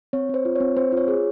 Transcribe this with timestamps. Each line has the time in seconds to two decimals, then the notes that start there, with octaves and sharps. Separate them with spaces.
0.13 C4 C#5
0.29 C4 C5
0.45 F4
0.55 C4 C#5
0.76 C4 C5
0.92 F4 C#5
1.08 G#4